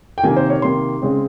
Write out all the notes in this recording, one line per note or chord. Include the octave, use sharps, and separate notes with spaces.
G5
C3 D#3 A#3 G#5
C5
C#5
C3 D#3 A#3 C6
C#3 G#3 C4